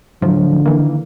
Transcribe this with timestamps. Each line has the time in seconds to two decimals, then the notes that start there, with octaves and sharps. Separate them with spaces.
0.22 A2 D3 F3 F#3
0.66 D#3 E3 A#3